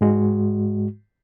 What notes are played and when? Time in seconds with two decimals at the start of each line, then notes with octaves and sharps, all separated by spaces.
0.01 G#2 G#3 F#4